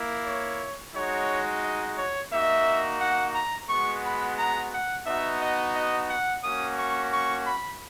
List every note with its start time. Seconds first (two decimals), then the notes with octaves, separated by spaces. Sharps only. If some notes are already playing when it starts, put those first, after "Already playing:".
Already playing: A#3 E4
0.25 C#5
0.95 G#3 D#4 F#4 C#5
1.63 D#5
1.97 C#5
2.32 A#3 D#4 F#4 E5
3.00 F#5
3.34 A#5
3.69 G#3 B3 F#4 C#6
4.04 B5
4.38 A#5
4.72 F#5
5.06 B3 D#4 F#4 E5
5.41 D#5
5.75 D#5
6.10 F#5
6.43 A#3 C#4 F#4 D#6
6.78 C#6
7.12 C#6
7.47 B5